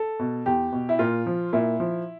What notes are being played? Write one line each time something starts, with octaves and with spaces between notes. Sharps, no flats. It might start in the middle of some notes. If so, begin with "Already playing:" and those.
Already playing: A4
B2
E2 G4
B2
E4
A#2 F4
F3
A#2 E4
F3